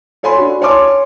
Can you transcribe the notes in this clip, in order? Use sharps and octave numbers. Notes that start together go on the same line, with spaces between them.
A4 C#5 G#5 B5 C6
D4 F#4
C#5 G#5 A5 C6 D6